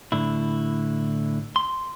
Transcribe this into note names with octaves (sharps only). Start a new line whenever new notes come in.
A2 D3 E4
C6